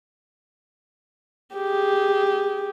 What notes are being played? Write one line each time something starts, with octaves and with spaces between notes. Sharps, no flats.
G4 G#4